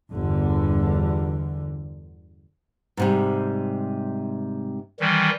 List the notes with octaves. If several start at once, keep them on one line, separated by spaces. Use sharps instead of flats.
G1 E2 D3
G#2 C3 G3
D#3 E3 G3